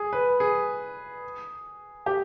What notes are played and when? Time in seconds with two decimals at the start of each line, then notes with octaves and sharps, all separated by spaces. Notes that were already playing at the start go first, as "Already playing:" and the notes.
Already playing: G#4
0.13 B4
0.40 G#4
2.06 G4